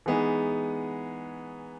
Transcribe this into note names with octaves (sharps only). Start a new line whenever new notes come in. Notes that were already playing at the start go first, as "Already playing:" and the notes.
E3 G#3 B3 D#4 G#4